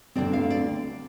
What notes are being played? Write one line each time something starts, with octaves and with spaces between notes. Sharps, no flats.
D2 D3 F3 C4 D5
F5
D5